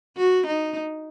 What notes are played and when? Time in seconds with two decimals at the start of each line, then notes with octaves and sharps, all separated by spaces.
0.17 F#4
0.46 D#4